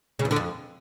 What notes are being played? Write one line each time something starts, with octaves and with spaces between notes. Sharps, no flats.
C#3
E2
D3
F2